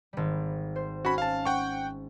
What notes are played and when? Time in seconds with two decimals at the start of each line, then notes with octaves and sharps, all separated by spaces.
0.13 G#1 G3
0.76 C5
1.05 C#4 F#4 B5
1.18 F5 A5
1.46 F#5 G5 C#6